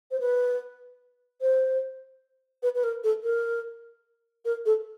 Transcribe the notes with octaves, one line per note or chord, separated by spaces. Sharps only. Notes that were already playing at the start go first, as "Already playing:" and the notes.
C5
B4
C5
B4
B4
A#4
A4
A#4
A#4
A4